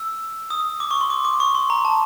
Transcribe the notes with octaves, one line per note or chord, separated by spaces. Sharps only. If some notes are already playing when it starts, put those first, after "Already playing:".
Already playing: E6
D#6
D6
C#6
C6
D6
D6
C#6
C6
A#5
A5